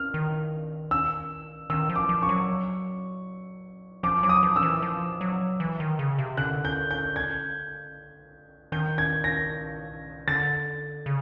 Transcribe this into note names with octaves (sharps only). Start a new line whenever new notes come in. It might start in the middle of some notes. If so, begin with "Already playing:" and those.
Already playing: F6
D#3
E6
D#3 E6
F3
D6
F3
C#6
F#3
F3 D6
F#3 D6
D#6
F3
E6
E3
F3
F#3
E3
D#3
C#3
C3
D3 F#6
G6
G6
G#6
D#3 G6
G#6
A#6
D3 A6
C#3